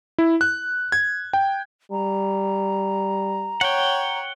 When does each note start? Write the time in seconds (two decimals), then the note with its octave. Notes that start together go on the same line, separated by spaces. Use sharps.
0.18 E4
0.41 F#6
0.92 G#6
1.33 G5
1.92 G3 A#5
3.61 C#5 F#5 G5